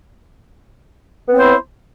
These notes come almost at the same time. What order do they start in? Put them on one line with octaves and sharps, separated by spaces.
B3 C4 C#5 C5 E4